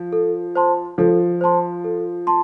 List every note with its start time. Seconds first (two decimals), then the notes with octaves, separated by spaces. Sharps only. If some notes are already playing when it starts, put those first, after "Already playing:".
Already playing: F3
0.13 A4
0.56 C5 A5 C6
0.98 F3 A4
1.41 C5 A5 C6
1.84 A4
2.27 A5 C6